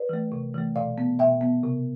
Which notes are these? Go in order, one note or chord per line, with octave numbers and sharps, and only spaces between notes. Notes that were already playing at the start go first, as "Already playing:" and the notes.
Already playing: B4 D5
E3 A3
C3
E3 A3
B2 D5 F5
B3
B2 E5 G5
B3
C3